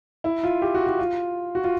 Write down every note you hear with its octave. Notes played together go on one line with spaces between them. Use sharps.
E4
F4
G4
F#4
F#4
F4
F#4
F4